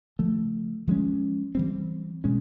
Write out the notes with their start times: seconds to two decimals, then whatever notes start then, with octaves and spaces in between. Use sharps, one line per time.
0.19 C#3 F3 A3
0.87 F3 G#3 C#4
1.55 E3 G3 C4
2.24 B2 G#3 C#4